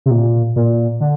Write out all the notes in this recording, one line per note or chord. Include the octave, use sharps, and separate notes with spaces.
C3
A#2
A#2
D3